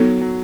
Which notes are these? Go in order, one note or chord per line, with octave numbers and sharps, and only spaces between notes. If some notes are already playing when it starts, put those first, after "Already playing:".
Already playing: F#3 B3 D#4 A4
F#3